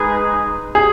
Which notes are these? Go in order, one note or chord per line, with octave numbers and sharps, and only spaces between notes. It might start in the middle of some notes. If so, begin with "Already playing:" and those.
Already playing: G#3 D#4 G#4 B4
G#4